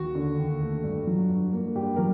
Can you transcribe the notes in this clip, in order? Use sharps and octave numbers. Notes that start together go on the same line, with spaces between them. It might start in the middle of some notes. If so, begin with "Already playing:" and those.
Already playing: D#2 F#4
D3
D#2
A3
G2
F#3
G2
A#3
G2 G4
F#3 A#4